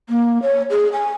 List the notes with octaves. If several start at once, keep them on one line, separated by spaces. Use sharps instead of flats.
A#3
C#5
G#4
G#5